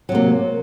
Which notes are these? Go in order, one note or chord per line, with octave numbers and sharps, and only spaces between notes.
C3 F#3 A#3